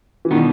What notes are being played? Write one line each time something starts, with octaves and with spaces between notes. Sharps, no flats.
E3
B2 D#3 G3 B3